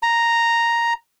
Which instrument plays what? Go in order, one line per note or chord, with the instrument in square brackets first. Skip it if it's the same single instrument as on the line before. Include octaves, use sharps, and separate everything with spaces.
[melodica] A#5